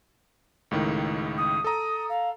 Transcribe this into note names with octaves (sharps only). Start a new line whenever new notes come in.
C#2 A2 D#3
D#6
A4 A#5 D#6
F5